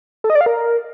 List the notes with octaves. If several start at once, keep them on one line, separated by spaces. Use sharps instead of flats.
A4
D#5
D5
F5
A#4